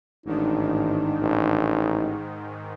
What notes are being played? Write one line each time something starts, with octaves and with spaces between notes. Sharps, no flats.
A1 G#2 D#3 D4 D#4
A1